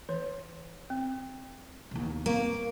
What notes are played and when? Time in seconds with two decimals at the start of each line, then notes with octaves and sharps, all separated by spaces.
0.09 E3 C#5
0.90 C4
1.91 D#2 B2
2.26 A#3 C4 A#5 C#6